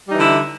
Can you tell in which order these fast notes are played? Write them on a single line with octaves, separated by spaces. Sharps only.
G3 D#4 E3 D3 E4